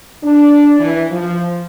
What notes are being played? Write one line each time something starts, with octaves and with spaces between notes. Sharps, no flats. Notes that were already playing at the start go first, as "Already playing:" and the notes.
D4
E3
F3